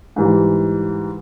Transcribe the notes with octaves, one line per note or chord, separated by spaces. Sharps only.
G#2 E3 G3